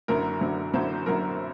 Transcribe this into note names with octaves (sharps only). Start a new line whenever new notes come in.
F#1 F#2 D3 F#3 A#4
F#1 F#2 D3 F#3
F#1 F#2 D3 F#3 C5
F#1 F#2 D3 F#3 A#4